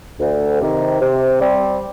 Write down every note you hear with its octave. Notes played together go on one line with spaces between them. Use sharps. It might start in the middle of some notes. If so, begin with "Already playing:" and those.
D2
C3 D#3
C3
G3 C4